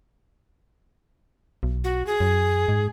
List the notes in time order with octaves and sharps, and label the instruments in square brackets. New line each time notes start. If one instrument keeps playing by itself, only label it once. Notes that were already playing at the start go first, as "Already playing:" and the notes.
[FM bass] B1
[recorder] F#4
G#4
[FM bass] F#2
G#2